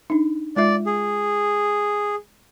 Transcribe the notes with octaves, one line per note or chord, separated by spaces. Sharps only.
D4 D#4
G#3 F4 D5 E5
G#4